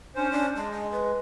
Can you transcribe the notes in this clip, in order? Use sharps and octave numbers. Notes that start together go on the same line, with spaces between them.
C#4 D4 C5
D4
G#3 A5
D#5
B4